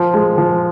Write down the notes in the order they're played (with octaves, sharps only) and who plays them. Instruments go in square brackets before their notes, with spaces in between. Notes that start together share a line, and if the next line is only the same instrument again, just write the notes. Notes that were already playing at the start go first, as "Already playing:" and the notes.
Already playing: [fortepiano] F3
G#3
F3